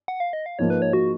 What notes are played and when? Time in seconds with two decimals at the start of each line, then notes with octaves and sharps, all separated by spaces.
0.08 F#5
0.20 F5
0.33 D#5
0.46 F5
0.59 G#2 F3 A#3 C#5
0.70 B4
0.82 C#5
0.93 F#4